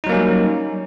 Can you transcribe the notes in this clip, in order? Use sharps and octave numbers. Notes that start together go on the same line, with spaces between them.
F#3 G3 A#3 C#4 D#4